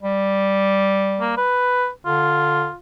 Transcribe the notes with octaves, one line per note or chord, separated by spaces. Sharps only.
G3
A#3
B4
D3 F4